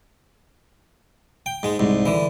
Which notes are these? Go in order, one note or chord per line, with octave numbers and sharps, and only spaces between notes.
G5
G#2 G#3
C2 G#2
D3 E3